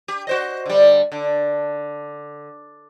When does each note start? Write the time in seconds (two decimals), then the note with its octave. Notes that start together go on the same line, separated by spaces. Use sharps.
0.08 G4
0.27 F#4 C5 D#5
0.66 D3 G3
1.12 D3